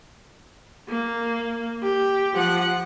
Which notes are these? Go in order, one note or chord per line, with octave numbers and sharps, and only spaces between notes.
A#3
G4
F3 F#5